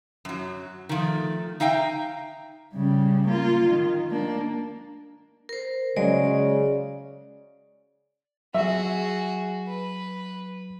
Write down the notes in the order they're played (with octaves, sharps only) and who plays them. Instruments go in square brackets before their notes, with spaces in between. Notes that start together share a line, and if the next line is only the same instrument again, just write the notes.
[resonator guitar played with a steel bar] F#2 F#3
D#3 F3 A3
D#4 E5 F5 G5 A#5
[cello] C#3 G3
A#3 F4
D#3
A#3 D4
[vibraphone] A#4 C5
[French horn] C#3 [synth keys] F#3 G#3 [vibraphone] D5
[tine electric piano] F#3 [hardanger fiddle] F#4 G#4 [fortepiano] E5
[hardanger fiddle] B4